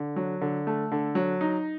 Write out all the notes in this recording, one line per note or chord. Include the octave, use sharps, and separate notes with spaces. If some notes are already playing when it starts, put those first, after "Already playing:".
Already playing: D3
F#3
D3
A3
D3
F#3
D#4